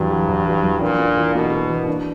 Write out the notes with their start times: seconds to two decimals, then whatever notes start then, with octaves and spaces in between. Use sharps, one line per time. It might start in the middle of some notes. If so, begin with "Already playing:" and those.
Already playing: E2 G2 F#3
0.12 F#3
0.28 E2
0.46 F#3
0.64 E2
0.82 A#2 D4
1.00 D4
1.17 E3
1.35 B2 A#3
1.52 A#3
1.70 E3
1.88 D4